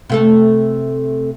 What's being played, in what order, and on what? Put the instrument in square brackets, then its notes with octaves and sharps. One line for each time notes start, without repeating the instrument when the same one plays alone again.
[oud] C3 A3 A4